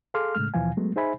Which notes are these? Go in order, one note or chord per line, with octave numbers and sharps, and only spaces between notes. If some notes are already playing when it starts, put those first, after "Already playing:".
G#4 A4 F5 C6 D6 F6
A2 C#3 G#3 A3 F6
D#2 B2 E3 F3 F5 G#5
F#3 G#3 A3 B3
D#4 G#4 C5 E5 G#5 B5